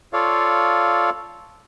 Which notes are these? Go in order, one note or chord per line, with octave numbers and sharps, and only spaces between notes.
F4 A4 C#5 D5 F5